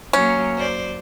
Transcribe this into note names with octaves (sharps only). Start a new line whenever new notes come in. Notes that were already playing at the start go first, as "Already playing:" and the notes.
F#3 A#3 C#4
F#2 C5 D5